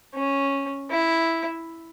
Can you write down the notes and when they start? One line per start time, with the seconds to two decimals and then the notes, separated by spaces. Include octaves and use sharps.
0.14 C#4
0.91 E4